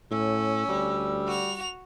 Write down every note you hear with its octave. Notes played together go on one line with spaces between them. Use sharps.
A2 C#4 E6
D2 G3
F#4 F7